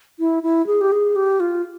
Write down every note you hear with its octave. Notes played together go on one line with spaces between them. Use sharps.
E4
E4
G#4
G4
G#4
G4
F4